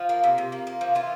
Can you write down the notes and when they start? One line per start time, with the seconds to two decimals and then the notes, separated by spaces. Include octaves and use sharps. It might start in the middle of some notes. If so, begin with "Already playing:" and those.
Already playing: F3 F4
0.09 A#3
0.23 C3
0.38 C3
0.52 A#3
0.67 A#3
0.81 F3
0.95 E3 F4